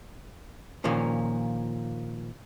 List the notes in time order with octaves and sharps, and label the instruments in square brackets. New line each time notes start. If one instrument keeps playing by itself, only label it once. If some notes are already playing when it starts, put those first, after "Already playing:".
[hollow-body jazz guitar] A#2 D#3 F3 A#3 C#4